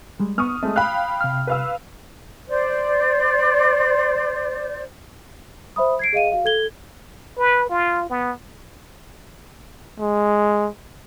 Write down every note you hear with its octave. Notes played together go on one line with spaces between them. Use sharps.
G3 G#3
B3 C#6 D#6 F6
G#3 A3 C4
F5 G5 B5 F#6
C3 F6
B4 F5 E6
C5 D5
C5 E5 B5 D#6
G#6 C7 D7
G#4 D#5 F5 D#7
F#4 F5
A4 G#6 G7
B4
F4
B3
G#3